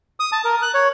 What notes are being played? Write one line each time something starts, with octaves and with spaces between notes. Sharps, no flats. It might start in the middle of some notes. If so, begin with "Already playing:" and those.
D#6
A5
A#4
F#6
C#5